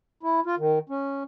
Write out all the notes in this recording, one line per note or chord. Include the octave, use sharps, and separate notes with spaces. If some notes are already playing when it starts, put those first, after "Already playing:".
E4
F4
D#3
C#4